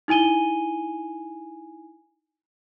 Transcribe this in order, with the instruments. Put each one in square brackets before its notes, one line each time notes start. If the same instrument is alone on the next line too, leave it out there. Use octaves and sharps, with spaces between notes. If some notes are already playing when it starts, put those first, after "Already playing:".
[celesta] D#4 E4 G#5 D#7 G7